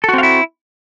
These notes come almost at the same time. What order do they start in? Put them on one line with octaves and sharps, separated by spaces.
A4 F#4 C4 F5 E4